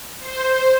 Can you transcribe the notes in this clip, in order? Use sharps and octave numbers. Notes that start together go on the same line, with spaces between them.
C5